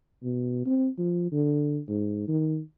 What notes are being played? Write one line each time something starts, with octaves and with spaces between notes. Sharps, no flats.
B2
C4
F3
D3
G#2
D#3